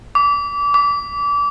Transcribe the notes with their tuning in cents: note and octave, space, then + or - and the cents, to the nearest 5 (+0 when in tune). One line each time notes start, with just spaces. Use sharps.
D6 -30
D6 -30